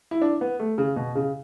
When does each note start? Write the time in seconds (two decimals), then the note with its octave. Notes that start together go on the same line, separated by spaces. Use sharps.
0.11 E4
0.22 D4
0.41 B3
0.60 A3
0.78 C#3
0.96 B2
1.15 C#3